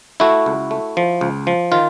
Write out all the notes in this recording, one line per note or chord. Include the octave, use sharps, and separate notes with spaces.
A3 E4 F#4
C#2
A3
F3
C#2
F3
D#3 F4